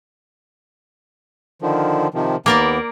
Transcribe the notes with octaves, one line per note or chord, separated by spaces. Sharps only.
D3 D#3 F3
C3 D#3 F3
D#2 A#3 B3 A#4 D5